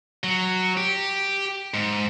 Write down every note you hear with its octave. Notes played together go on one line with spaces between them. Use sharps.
F#3
G4
G#2